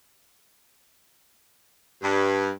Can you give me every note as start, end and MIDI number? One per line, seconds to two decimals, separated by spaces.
2.03 2.50 43